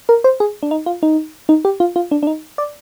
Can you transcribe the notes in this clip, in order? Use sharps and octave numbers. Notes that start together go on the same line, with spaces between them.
A#4
C5
G#4
D4
D#4
F4
D#4
D#4
G4
F4
F4
D4
D4
D#4
D5